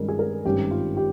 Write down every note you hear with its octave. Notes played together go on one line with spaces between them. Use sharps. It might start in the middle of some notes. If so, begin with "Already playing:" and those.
Already playing: G2 D#3 G#3 C#4 A#4
G#4
A#4
G#1 G2 G3 C#4 G4
F4
G4